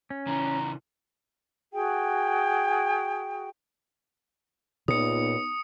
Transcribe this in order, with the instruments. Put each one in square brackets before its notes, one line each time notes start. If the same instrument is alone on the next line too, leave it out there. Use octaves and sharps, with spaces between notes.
[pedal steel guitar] C#4
[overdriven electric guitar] C#3 E3 [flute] A#5
[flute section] F#4 G#4 G5
[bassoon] C#2 [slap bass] A#2 [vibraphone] B3 D#4 [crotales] D#6 C#7